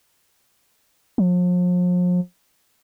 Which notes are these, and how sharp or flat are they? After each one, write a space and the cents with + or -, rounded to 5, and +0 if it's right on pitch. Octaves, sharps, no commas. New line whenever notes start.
F3 +40